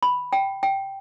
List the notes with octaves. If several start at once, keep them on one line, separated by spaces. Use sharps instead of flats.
B5
G5
G5